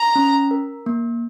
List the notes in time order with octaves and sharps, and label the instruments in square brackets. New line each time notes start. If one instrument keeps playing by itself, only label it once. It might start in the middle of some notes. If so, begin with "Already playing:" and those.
Already playing: [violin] A#5
[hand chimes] C#4
A#4
A#3